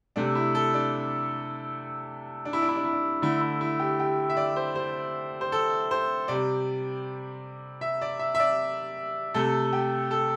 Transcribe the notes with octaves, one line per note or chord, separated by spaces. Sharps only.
C3 A3 D4
E4
A4
D4
D4
E4
D4
E4
D4
E4
D4
D3 A3 E4
E4
E4
G4
G4
E5
D5
C5
C5
C5
A4
C5
C3 G3 D5
E5
D5
E5
E5
D5
C3 A3 A4
G4
A4